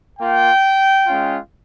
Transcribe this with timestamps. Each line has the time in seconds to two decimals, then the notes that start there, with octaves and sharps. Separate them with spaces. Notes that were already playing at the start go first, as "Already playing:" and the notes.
0.19 A#3 F4 G5
1.07 G#3 C#4 F4